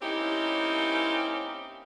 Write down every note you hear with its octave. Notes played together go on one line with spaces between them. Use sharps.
A#3 C4 C#4 D#4 E4 G4